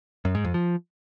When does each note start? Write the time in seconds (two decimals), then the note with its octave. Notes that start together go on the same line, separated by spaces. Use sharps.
0.25 F#2
0.35 G#2
0.44 F2
0.54 F3